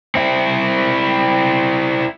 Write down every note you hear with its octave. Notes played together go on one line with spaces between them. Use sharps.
C4 E4